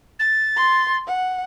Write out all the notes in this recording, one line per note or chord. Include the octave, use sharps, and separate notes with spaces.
A6
C6
F#5